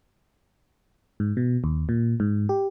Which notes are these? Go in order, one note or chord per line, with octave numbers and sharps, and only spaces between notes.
G#2
B2
D#2
A#2
G#2
G4